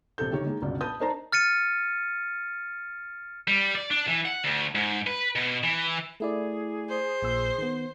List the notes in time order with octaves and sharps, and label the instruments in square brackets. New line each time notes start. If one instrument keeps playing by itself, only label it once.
[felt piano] A#1 C3 A4 G6
D#3 G4 C#5
D#3 G#3 A#3
G1 C#2 B2 D5
B4 A5 D#6 G6
D4 D#4 A#4 C5 A5 A#5
[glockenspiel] F6 A6 C#7 D#7
[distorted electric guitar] G3
D5
D4
E3
F#5
D2
G#2
B4
B2
E3
[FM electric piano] A3 E4 D5 [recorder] G#4
[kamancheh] C5
[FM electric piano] A#1 A#2 E6
D#3 B3